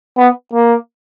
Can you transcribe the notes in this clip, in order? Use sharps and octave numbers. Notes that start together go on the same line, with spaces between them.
B3
A#3